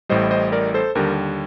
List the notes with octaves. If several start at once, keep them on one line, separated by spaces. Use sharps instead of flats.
A1 A2 G3 C5 D#5
C5 D#5
A#4 D5
A4 C5
D#2 D3 G3 G4 A#4